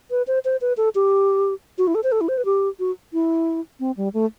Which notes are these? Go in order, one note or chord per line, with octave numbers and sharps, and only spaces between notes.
B4
C5
C5
B4
A4
G4
F#4
E4
A4
C5
A4
E4
C5
B4
G4
F#4
E4
C4
G3
A3